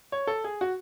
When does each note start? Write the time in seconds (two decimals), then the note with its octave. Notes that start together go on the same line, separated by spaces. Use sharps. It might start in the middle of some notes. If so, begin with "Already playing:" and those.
0.12 C#5
0.27 A4
0.44 G#4
0.61 F#4